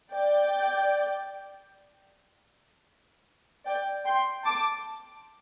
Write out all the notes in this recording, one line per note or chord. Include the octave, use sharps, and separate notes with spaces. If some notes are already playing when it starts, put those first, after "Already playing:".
D5 G5
D5 G5
G5 C6
A5 D6